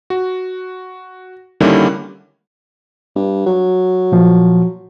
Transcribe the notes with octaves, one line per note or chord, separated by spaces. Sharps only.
F#4
D3 D#3 G3 A#3 C#4 E4
G2
F#3
A#2 F3